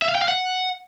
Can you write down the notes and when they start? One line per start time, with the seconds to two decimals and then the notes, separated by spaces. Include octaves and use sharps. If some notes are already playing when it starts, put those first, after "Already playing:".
0.02 E5
0.09 F5
0.15 G5
0.22 F5
0.28 F#5